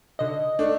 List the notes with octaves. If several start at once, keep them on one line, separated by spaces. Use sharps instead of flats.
D3 D#5
A3 D4